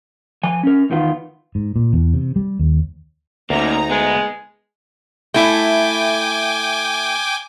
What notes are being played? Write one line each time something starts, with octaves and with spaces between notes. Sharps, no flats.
F3 G#5
C#4 A#4
E2 D#3 B3 F4
G#2
A#2
E2
C3
G3
D#2
D2 A#3 C#4 D#4 A#5
G#3 B3
A3 E4 G5 G#5 D6